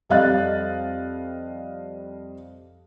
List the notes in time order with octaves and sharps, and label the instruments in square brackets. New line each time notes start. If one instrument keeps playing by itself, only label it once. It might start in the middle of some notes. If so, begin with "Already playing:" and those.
[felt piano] F2 G3 D#5 F5 F#6 A6